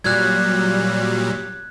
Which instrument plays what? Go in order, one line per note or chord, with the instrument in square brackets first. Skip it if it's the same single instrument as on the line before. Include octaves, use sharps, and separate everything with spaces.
[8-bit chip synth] A#2 F#3 G3 [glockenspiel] F#6 G#6